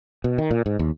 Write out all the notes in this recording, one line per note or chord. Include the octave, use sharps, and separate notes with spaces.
B2
D#3
A#2
G#2
D#2